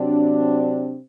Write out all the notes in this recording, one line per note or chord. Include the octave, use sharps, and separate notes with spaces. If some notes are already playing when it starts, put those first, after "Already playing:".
Already playing: C3 F#3 C4 D4